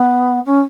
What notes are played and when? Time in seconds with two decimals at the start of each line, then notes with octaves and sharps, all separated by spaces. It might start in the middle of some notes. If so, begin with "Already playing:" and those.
Already playing: B3
0.46 C#4